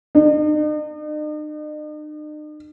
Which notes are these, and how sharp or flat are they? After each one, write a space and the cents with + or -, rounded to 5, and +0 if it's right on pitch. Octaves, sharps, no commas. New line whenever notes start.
D#4 -45